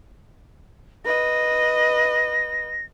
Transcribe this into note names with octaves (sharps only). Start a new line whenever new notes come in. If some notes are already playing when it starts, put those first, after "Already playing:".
B4 D#5 A#6